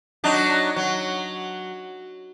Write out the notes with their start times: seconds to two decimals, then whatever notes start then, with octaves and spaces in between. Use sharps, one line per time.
0.24 F#3 D4 D#4
0.76 F#3